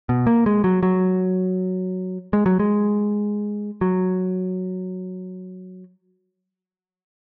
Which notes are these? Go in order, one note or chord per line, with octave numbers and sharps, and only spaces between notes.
B2
A#3
G#3
F#3
F#3
G#3
F#3
G#3
F#3